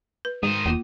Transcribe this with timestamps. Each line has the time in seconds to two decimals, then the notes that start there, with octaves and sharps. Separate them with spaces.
0.25 B4
0.43 G#2 D#3 C5 D#6
0.66 E1 A#3 F4